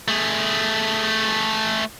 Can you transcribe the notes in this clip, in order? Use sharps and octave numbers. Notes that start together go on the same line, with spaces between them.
A3 G#4